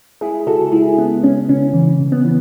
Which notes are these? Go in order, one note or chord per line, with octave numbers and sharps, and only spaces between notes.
G#3 E4 G#4
C#3 F#4 A4
G#3 E4 G#4
C#3 B3
G#3 C#4
C#3 C#4
E3
C#3
B3
E3